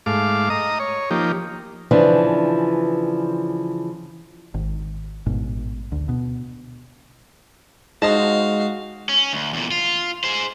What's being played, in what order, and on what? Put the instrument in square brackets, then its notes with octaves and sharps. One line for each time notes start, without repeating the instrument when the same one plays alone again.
[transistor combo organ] G#2 A3 F5 D6
D#5 A#5 D#6
C#5
F3 A#3 D#4 G4
[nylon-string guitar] C#3 E3 F3 D4
[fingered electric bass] G#1
A1 G#2 B2
D2
B2
[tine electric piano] G#3 [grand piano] D#4 [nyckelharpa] F#4 F5 [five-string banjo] C5 D#5 A5
[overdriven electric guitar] C#4
D2
E2 A#2
F4
G#4 C5